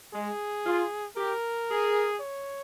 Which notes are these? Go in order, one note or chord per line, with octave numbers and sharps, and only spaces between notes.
G#3 G#4
F4
G4 A#4
G#4
C#5